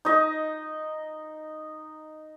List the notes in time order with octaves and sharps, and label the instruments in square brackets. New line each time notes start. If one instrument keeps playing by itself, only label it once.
[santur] D#4 D#5